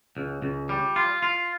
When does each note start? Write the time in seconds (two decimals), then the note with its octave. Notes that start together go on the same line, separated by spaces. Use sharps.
0.17 C#2
0.42 C#2
0.69 G3
0.96 F4
1.23 F4